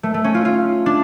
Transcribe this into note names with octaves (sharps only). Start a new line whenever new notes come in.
A3
A3
C#4
F4
F4
D4